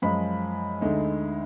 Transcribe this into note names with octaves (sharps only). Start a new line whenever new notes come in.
F#2 F3 G#3 B5
D2 D3 G#3 D#4